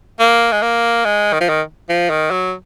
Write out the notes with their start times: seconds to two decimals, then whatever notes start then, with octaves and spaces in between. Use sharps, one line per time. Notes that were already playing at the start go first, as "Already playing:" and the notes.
0.20 A#3
0.52 G#3
0.62 A#3
1.05 G#3
1.33 D#3
1.40 F3
1.49 D#3
1.89 F3
2.10 D#3
2.31 F#3